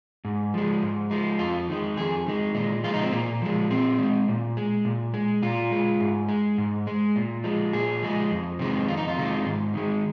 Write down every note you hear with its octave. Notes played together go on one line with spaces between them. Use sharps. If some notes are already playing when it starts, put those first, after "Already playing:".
G#2
F3 G#3
G#2
F3 G#3
F2 F4
D#3 G#3
F2 G#4
D#3 G#3
A#2 G#3
F3 G#3 F4
D#4
C4
A#2 A#3
F3 G#3
A#2 C4
G#3
A#2
G#3
A#2
G#3
A#2 F4
G#3
G#2
G#3
G#2
G#3
A#2
F3 G#3
A#2 G#4
F3 G#3
F2
C3 D#3 G#3
F2 F4
D#4
F4
C3 D#3 G#3
G#2
D#3 G#3